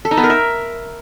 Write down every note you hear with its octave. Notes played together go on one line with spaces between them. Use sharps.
A4
D#4
B3
A#4
E5